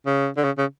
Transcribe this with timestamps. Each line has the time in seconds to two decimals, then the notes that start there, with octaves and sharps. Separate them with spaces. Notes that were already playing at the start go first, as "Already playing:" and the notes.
0.06 C#3
0.37 D3
0.44 C#3
0.58 C#3